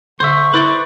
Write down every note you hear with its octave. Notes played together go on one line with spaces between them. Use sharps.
D3 C5 E5 C#6
E4 B4 C5 D5